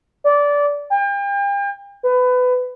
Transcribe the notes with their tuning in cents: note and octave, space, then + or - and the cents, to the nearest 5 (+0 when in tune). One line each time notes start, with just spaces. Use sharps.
D5 -20
G5 +40
B4 +25